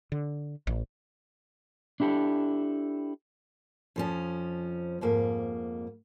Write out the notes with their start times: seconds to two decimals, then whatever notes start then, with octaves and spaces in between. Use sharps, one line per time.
0.12 D3
0.67 A1
2.00 D4 E4 G4 A4
3.96 F2 F3 C#4
5.01 F2 G#2 A#3